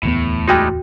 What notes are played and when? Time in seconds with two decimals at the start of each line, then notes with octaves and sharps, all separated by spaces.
0.03 D1 E2 A2 B3
0.48 G3 G#3 D#4 F#4 G5